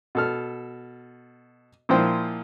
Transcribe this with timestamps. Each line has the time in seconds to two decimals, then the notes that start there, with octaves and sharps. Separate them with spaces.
0.15 B2 A4 F6
1.89 A#2 F3 E4 A#4 C5 G5